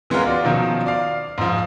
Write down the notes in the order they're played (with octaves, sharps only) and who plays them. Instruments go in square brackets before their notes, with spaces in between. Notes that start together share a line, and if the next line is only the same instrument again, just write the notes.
[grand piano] E3 G#3 B3 C#4 F4 A#4
F4 F#4 D5
B2 D#3 F3 F#3 C#4
D5 F5
G#2 F3